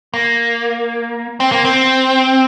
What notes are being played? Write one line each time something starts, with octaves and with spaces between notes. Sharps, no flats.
A#3
C4
A#3
C4